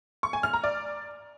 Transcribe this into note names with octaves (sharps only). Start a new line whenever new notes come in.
C#6
G#5
F6
A#5
D5